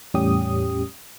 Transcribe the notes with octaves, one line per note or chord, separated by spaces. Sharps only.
E2 A2 G3 C#4 G4 D#6